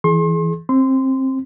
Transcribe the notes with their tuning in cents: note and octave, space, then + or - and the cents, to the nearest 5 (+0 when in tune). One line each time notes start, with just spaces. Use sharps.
E3 +0 G#4 +25 C6 +35
C4 +20 C6 -20